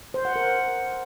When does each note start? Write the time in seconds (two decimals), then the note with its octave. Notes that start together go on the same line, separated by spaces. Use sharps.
0.14 C5
0.25 F#5
0.36 A#4